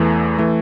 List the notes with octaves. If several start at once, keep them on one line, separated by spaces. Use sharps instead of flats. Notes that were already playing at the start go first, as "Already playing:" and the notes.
Already playing: E2 E3 A3
E3 A3